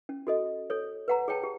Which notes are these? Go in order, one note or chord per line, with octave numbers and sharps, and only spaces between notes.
C#4
F#4 A4 D#5
A4 C#5
B4 F#5 A#5
G#4 C#5 G5 A5
G4